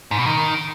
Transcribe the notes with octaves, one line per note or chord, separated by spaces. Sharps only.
G#2
B2
D#3